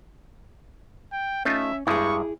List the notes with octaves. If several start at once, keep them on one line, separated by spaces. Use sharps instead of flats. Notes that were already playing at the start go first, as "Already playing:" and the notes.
G5
A3 C#4 D#4 F4 E5
G2 G3 G#3 E4 G#4 C#6